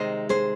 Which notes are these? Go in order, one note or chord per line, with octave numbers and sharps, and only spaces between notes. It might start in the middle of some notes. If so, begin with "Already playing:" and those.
Already playing: C3 D#3 G#3 C5 D#5
G#4 C5